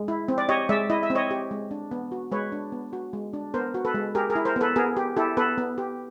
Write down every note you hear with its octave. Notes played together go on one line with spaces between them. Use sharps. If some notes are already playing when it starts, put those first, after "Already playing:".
Already playing: G#3
E4
C4
D5
G4 C#5 D#5
G#3 D5 E5
E4 D#5
E5
C4
C#5 D#5
G4
G#3
D4
B3
F#4
G#3 B4 C#5
D4
B3
F#4
G#3
D4
B3 A#4 C5
F#4
A4 B4
G#3
G4 G#4 A#4
G#4 A#4
E4
A#4 C5
B3 A4 B4
B3 G#4 A#4
G4
E4 G4 A4
B3 A4 B4
B3
G4